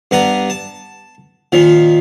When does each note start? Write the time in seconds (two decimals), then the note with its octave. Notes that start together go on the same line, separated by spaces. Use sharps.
0.11 G2 B3 B4 A#5
0.50 A5
1.52 A#2 D#3 F3